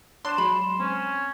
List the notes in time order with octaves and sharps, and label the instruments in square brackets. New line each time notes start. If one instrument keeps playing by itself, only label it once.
[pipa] D4 [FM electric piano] C#5 [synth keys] C6 E7
[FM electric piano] F#3 G#3 [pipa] B5
[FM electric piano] C4 [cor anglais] C#4